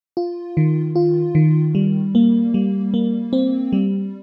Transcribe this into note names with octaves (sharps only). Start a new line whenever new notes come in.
F4
D#3
F4
D#3
G3
A#3
G3
A#3
C4
G3